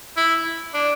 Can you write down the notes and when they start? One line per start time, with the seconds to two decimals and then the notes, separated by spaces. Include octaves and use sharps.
0.17 E4
0.74 D4